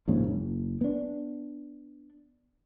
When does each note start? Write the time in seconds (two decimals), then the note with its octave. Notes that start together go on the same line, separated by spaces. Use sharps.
0.08 A#1 D#2 G#2 C#3
0.28 F#1
0.81 B3 D4